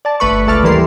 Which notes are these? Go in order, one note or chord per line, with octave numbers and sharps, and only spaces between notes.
D5 A5
G1 A3 B4 C#6
C#2 A3 A5 D6 F6
D#2 A2 E3 G3 A#4 C6